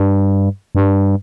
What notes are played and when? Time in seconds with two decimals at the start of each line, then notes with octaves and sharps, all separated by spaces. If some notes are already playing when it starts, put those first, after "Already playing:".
Already playing: G2
0.75 G2